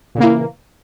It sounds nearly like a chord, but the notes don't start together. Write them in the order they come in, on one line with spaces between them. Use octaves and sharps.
A#2 C#3 A#3 E3